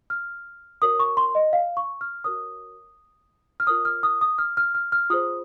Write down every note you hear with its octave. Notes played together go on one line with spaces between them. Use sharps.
F6
F#4 A#4 C#5 D#6
C#6
C6
D#5
F5
C#6
F6
F#4 A#4 C#5 D#6
F6
F4 A#4 C#5 D#6
F6
D#6
D#6
F6
F6
F6
F6
F4 G#4 C5 D#6